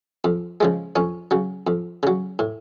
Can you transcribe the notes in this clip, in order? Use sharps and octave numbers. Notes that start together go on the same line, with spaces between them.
F2
C#3 F3 G#3
F2 C#4
C#3 F#3
F2
C#3 F#3
A2